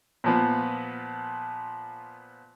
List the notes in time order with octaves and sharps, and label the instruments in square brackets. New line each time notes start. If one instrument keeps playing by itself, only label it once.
[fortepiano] A#2 F3 B3